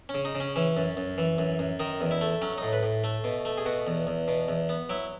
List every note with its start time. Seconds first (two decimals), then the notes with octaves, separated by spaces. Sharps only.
0.09 C#4
0.14 C#3
0.25 D#4
0.35 C#3
0.40 C#4
0.56 E3 C#4
0.76 F#2
0.97 F#2
1.18 E3
1.38 F#2
1.59 F#2
1.80 D#3 D#4
2.01 E2
2.11 E4
2.21 A3
2.42 F#3 C#4
2.58 A2 D#4
2.73 B4
2.83 A2
3.04 A3
3.24 B2
3.45 A3
3.58 G#4
3.65 B2 F#4
3.87 E2
4.07 E2
4.28 B2
4.48 E2
4.69 B3
4.89 F#3 E4